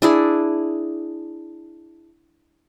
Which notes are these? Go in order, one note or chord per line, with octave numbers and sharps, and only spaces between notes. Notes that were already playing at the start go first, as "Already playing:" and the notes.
D4 E4 G#4